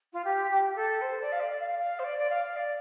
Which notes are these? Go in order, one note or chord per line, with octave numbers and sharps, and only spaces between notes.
F4
G4
G4
A4
C5
D5
F5
D5
F5
F5
C5
D5
D5
F5
D5